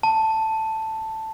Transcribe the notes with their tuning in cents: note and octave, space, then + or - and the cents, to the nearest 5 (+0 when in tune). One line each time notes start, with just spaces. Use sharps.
A5 +5